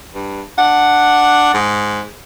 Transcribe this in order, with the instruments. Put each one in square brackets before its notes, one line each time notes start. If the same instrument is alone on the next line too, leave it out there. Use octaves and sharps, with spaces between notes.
[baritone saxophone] G2
[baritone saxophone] D4 [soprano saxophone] F#5
[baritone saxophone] G#2